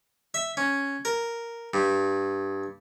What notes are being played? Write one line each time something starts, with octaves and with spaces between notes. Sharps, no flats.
E5
C#4
A#4
G2